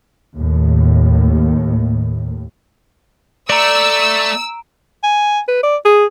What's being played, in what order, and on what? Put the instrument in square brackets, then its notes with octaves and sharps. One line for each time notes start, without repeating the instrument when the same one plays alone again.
[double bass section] D#2 A2
[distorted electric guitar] A3 [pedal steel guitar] D5 [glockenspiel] A#5 D7 [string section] E6
[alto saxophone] G#5
B4
D5
G#4